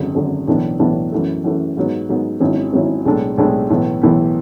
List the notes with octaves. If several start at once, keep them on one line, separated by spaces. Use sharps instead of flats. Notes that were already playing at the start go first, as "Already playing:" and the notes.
Already playing: G#1 F#2 D3
G#1 F#2 D3
B1 A2 E3 B3 D4
B1 A2 E3 B3 D4
F#2 E3 A3
F#2 E3 A3
G#2 F#3 B3
G#2 F#3 B3
G#1 G#2 F#3 C#4 E4
G#1 G#2 F#3 C#4 E4
B1 A2 G#3 D4 A4
B1 A2 G#3 D4 A4
B1 A2 E3 B3
B1 A2 E3 B3